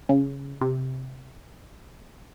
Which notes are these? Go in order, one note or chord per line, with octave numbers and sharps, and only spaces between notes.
C#3
C3